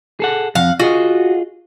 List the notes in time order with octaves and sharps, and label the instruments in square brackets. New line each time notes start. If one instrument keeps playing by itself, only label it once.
[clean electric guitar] G#4 A4 F#5
[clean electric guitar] F2 [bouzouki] F5 F#5
[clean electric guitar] F4 G#4 D#5 [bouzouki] F#4